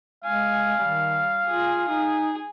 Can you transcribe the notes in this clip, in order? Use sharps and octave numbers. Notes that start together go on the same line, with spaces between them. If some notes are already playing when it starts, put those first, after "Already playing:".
G#3 F5 G#5
D#3 G3
F4 G#4
D#4 G#4